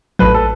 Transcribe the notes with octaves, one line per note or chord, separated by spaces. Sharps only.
A1 A2 F#3 B4
A4